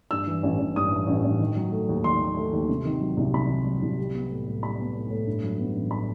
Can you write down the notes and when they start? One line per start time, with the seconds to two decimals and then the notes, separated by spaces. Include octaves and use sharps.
0.11 G2 E6
0.27 E3
0.43 A1
0.59 A1
0.76 G2 D#6
0.92 E3
1.07 A1
1.25 A1
1.40 D#3
1.57 F#3
1.72 A3
1.89 D#2
2.04 D#3 C6
2.21 F#3
2.37 A3
2.53 D#2
2.69 C3
2.85 D#3
3.01 F#3
3.17 C2
3.34 C3 B5
3.50 D#3
3.65 F#3
3.82 C2
3.99 G3
4.14 B3
4.30 A2
4.47 A2
4.62 G3 B5
4.79 B3
4.95 A2
5.10 A2
5.26 G2
5.44 F#3
5.59 B3
5.76 A1
5.91 B5